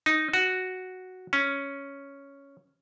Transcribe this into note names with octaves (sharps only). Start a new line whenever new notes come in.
D#4
F#4
C#4